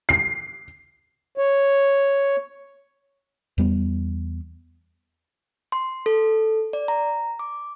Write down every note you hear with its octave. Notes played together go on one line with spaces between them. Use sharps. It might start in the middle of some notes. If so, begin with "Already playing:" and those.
C7
C#5
E2 G3 B3
C6
A4
D5
A#5
D6